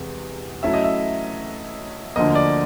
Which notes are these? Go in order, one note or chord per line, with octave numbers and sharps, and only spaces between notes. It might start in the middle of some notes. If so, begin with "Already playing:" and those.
Already playing: E2 C3 G#3
F#3 A3 C#4 E4 A4 E5
D#5
E5
D2 D3 F3 A#3 D#5
D5